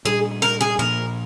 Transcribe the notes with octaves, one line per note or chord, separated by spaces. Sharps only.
A#2 G3 D4 G#4
A#4
G#4
A#2 F3 A#3 D4 A#4